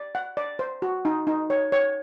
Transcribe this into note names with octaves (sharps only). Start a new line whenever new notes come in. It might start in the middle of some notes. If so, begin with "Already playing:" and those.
Already playing: D5
F#5
D5
C5
F#4
D#4
D#4
C#5
C#5